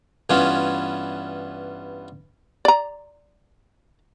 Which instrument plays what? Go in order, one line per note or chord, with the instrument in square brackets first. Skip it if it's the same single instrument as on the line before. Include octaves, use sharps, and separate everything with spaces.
[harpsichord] G2 E3 B3 C#4 F4
[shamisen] D5 A#5